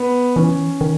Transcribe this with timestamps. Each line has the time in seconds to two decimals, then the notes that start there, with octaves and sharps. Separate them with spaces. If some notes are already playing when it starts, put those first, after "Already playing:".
Already playing: B3
0.36 E3 C#4
0.81 D#3